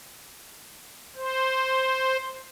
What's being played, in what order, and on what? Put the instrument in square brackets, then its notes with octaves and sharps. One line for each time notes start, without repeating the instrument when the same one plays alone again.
[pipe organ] C5